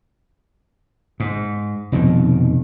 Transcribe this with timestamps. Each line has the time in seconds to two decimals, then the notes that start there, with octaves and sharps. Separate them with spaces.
1.20 G#2
1.92 F1 F2 B2 D#3